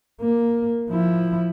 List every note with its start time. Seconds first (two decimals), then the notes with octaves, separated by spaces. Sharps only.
0.21 A#3
0.90 F3 E4